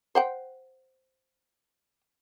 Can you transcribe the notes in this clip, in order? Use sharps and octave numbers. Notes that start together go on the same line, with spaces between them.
C5 F#5 G5